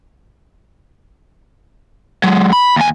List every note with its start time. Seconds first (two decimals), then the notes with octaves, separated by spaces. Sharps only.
2.24 F#3 G#3
2.53 B5
2.76 D#2 G#5